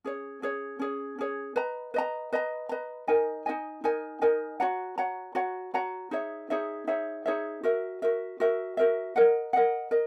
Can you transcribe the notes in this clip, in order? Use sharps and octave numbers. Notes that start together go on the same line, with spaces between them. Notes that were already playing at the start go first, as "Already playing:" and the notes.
C#4 G#4 C#5
C#4 G#4 C#5
C#4 G#4 C#5
C#4 G#4 C#5
B4 D#5 A#5
B4 D#5 A#5
B4 D#5 A#5
B4 D#5 A#5
D#4 A#4 D#5 G#5
D#4 A#4 D#5 G#5
D#4 A#4 D#5 G#5
D#4 A#4 D#5 G#5
F#4 C#5 F#5 A#5
F#4 C#5 F#5 A#5
F#4 C#5 F#5 A#5
F#4 C#5 F#5 A#5
D#4 G#4 C#5 E5
D#4 G#4 C#5 E5
D#4 G#4 C#5 E5
D#4 G#4 C#5 E5
F#4 A#4 E5
F#4 A#4 E5
F#4 A#4 E5
F#4 A#4 E5
A#4 D#5 F#5
A#4 D#5 F#5
A#4 D#5